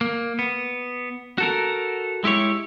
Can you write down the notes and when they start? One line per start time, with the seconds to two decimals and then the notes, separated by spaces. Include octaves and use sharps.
0.01 A#3
0.39 B3
1.38 F#4 A4 A#4
2.24 G#3 E4 G4 C#5